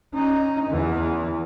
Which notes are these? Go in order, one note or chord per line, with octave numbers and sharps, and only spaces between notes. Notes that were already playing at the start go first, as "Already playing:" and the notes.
C#4 D#4
E2 E3